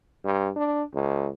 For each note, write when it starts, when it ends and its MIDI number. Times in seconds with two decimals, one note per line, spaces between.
0.25 0.50 43
0.56 0.83 62
0.94 1.30 37